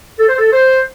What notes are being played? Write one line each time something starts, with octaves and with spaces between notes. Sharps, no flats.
A4
C5
A4
C5